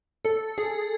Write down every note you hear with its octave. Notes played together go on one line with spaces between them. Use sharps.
A4
G#4